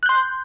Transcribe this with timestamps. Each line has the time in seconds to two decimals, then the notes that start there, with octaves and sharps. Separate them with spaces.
0.03 F#6
0.06 G6
0.09 C6